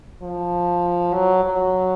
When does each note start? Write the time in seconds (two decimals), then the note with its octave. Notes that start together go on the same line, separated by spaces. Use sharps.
0.22 F3
1.13 F#3
1.43 F#3